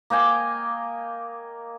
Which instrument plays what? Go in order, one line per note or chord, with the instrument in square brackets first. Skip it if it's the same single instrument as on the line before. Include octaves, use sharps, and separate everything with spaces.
[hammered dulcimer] A#3 D#5 G5 G#5